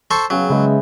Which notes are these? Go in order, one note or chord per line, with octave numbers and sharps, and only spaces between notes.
A4 C5 C#6
C#3 F#3 B3 G5
C#3 G#3 B4 E5